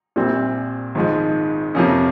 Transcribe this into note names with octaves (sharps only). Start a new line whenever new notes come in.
A#1 A#2 G3 C4
G#1 G#2 F3 G#3
F2 C3 F3 A#3 C#4